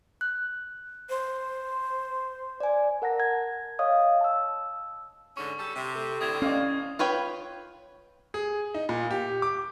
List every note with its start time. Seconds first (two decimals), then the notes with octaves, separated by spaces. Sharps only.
0.21 F#6
1.09 C5
2.60 D5 G#5
3.02 A#4 F#5 A5 A#6
3.20 G#6
3.79 C#5 D#5 F5 D#6
4.21 A5 E6
5.37 G#2 D3 C#4 C#6
5.59 G3 A4
5.75 C3
5.95 A3
6.21 A2 D3 C4 D#6 G#6 F7
6.42 C#4 D5 D#5 F5
6.99 F4 B4 C#5 G5
8.34 G#4
8.74 D#4
8.89 A#2
9.11 G4
9.42 D6